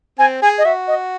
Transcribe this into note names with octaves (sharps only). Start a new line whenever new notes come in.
C4 G#5
G#4 G#5
D#5
F#4 E5
D#5